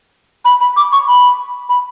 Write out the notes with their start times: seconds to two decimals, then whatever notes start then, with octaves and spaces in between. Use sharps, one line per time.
0.45 B5
0.61 B5
0.77 D6
0.92 C#6
1.08 B5
1.69 B5